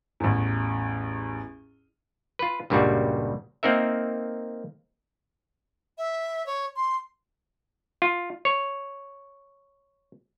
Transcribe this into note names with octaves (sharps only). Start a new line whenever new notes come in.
A1 E2
F4 B4
C#2 G2 A#2 C#3 G3 F#4
A#3 C4 D#4 A#4 E5
E5
C#5
C6
F4
C#5